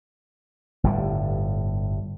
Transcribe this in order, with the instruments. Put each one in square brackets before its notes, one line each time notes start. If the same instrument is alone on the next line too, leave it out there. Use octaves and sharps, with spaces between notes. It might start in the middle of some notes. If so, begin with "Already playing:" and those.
[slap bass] G1 A2 G3